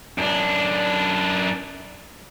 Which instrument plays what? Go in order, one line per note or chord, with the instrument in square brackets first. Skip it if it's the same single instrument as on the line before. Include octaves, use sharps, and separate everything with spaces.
[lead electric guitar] F#2 D4